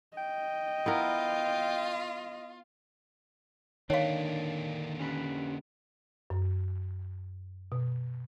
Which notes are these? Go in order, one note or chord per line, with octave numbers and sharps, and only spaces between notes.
D#5 G5
B3 E4 F4 A#4
D3 D#3 A#3 D4 C#5 F5
C#4 G4 B4
F#2
B2